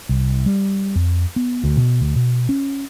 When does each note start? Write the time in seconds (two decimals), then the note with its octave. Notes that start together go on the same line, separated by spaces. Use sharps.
0.09 C2
0.46 G3
0.95 F2
1.36 B3
1.64 D2
1.77 B2
2.01 D2
2.16 B2
2.49 C#4